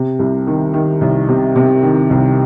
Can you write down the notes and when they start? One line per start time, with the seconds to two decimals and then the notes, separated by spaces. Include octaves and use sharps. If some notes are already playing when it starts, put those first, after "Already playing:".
Already playing: C3
0.19 C2
0.47 D#3
0.74 D#3
1.01 C2
1.29 C3
1.56 C3
1.83 D#3
2.10 C2